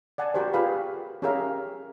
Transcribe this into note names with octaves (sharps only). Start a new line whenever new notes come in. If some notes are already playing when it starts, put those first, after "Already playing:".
D5 F#5 G#5 A5
F#4 G4 A#4 C5
F4 G4 G#4 B4 F5 B5
C#4 G4 G#4 A#4 E5 F5